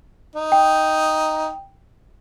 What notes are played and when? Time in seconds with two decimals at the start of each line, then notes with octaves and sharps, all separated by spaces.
0.35 D#4
0.52 G5